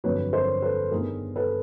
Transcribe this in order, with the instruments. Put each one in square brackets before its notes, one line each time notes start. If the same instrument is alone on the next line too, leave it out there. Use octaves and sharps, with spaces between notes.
[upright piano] G1 F2 D3 F#3 B4 C#5
A#4 C5
A4 B4
G2 D#3 G3 B3 G#4 A#4
A4 B4